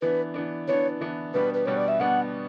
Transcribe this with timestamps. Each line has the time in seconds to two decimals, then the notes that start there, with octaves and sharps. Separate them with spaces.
0.02 E3 B3 D4 B4
0.34 E3 B3 D4
0.68 E3 B3 D4 C#5
1.01 E3 B3 D4
1.34 B2 G3 B3 D4 B4
1.54 B4
1.66 B2 G3 B3 D4 C#5
1.77 D5
1.88 E5
1.99 B2 G3 B3 D4 F#5